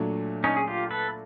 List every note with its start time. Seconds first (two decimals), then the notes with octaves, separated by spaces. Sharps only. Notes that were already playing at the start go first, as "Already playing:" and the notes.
Already playing: A#2 F#3 A3 D4
0.44 C#4 D#4
0.57 G#4
0.67 F4 G4
0.91 A4 B4